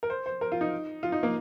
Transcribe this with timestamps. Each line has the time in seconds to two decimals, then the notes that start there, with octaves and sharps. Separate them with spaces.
0.03 A#4
0.10 C5
0.26 C5
0.41 A#4
0.52 F4
0.61 D#4
1.03 F4
1.12 D#4
1.23 A#3